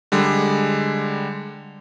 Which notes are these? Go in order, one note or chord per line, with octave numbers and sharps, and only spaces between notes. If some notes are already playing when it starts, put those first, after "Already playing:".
D3 G3 G#3